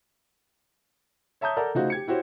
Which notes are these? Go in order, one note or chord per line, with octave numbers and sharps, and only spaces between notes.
C#5 E5 A5 A#5 D#6 G6
A4 A#4 D5 F#5 A#5
C#3 A3 D#4 F4 F#4 C5
G4 G#6 C#7
E4 F#4 G4 C5 C#5